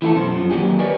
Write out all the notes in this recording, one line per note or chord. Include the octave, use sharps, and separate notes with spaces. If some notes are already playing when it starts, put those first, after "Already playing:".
E3 A3 F4 A4
F#2 B2 C5
F#2 F3
D#3 F#3 A#3 D4 G4 G#4
G4 A#4 B4 C#5 D5 G#5